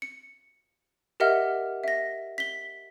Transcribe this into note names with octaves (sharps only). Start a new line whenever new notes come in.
C#7
G4 A#4 D#5 E5 F#5 F6
E5 A#6
B6 G7